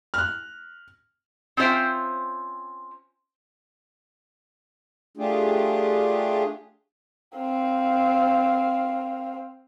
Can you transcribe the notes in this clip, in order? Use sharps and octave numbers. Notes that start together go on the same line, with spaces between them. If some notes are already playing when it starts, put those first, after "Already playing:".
F6 F#6
C4 C#4 F4 C5 E5 G5
A3 D4 F4 G4 G#4
C4 F5